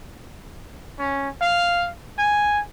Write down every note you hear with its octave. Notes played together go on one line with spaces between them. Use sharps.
C#4
F5
G#5